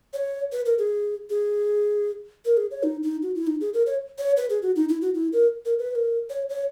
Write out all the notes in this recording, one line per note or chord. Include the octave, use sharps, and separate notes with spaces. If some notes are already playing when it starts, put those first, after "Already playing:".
C#5
B4
A#4
G#4
G#4
A#4
G#4
C#5
D#4
D#4
F#4
E4
D#4
G#4
A#4
C#5
C#5
B4
G#4
F#4
D#4
E4
F#4
E4
A#4
A#4
B4
B4
A#4
C#5
C#5